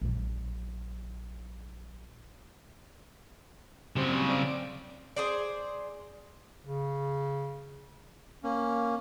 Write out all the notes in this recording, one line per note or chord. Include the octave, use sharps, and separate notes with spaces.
A#1 F#3
C#3 F#3 G3 C4
C4 D5 D7
G#4 C5 D5
C#3
A#3 C#4